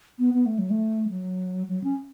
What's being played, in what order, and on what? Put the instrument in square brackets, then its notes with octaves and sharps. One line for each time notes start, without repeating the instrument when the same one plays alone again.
[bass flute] B3
B3
A3
F#3
A3
F#3
F#3
C#4